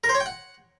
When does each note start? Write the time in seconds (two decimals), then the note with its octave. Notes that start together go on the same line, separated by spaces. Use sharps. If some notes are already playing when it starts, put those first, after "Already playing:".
0.04 A#4
0.09 C5
0.15 C#5
0.20 G5
0.26 F#5